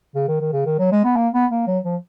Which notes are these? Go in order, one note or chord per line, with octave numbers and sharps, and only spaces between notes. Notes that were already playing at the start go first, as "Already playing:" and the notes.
C#3
D#3
D#3
C#3
D#3
F#3
G#3
B3
A#3
B3
A#3
F#3
F3